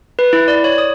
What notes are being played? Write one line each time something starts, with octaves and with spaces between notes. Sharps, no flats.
B4
E4
D5
C#5
D#6